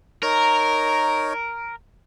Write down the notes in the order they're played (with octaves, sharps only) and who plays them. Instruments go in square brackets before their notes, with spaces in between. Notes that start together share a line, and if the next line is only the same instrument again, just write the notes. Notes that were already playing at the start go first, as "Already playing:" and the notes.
[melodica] D#4 C#5 [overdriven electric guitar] A#4